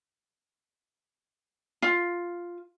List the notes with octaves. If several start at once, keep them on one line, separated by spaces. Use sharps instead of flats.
F4